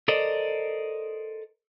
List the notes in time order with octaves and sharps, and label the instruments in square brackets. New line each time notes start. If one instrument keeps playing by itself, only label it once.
[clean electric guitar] A4 A#4 C5 D5 D#5